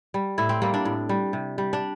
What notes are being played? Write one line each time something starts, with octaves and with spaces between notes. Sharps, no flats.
G3
A2 E4
C4
G3 A#3
D4
A2
G3
C3
G3
D4